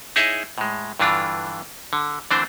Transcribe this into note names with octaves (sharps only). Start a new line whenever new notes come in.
D#4 E4 G#4 C#5 D#5 E5
A2 G#3
G2 D3 E3 D4 F4
D3
D3 E3 A3 C4 D4 C5